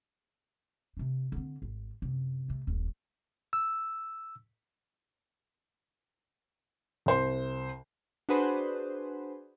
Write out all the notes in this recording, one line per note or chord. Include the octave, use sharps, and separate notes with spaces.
C3 D4
D3 C4
G#1
F#2 C3
C3 A3
D#1 A#1
E6
C2 C5 C6
D4 F#4 G#4 B4 C5